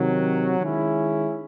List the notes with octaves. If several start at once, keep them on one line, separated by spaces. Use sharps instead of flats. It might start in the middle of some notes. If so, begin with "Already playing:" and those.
Already playing: C3 D#3 F#3
D#3 G#3 C#4 E4